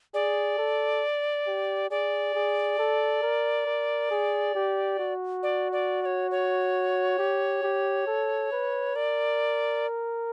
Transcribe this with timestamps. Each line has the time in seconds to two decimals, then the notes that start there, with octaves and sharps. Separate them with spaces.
0.14 G#4 D5
0.58 A4
1.47 G4
1.90 G#4 D5
2.35 G#4
2.79 A4
3.23 A#4
3.66 A#4
4.11 G#4
4.55 G4
5.00 F#4
5.43 D5
5.72 D5
6.02 D5
6.05 C#5
6.31 C#5
7.19 G4
7.63 G4
8.07 A4
8.52 B4
8.96 A#4 D5